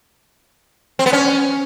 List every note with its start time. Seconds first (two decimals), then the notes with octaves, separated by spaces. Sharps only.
0.99 C4
1.06 B3
1.13 C#4